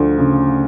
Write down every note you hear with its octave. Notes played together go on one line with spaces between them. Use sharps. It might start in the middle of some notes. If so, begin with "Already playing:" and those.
Already playing: D2 F3
C#3